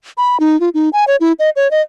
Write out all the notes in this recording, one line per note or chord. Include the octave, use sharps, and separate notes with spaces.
B5
D#4
F4
D#4
G#5
C#5
E4
D#5
C#5
D#5